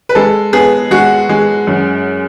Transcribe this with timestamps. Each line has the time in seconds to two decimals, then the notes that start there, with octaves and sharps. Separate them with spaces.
0.09 B4
0.15 G#3 A4
0.53 B3 G#4
0.91 G#3 F#4
1.29 G#3
1.67 F#2